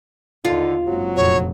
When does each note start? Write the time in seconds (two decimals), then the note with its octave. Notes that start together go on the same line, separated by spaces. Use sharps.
0.45 D#2 D3 D#4 F4
0.87 F#1 G#2 F#3 C4 F#4
1.16 F1 A#1 F2 C#5